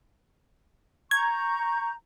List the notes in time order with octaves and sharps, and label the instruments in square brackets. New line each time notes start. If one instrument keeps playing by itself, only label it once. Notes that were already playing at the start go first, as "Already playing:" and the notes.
[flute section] A#5 C#6 G6 [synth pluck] G#6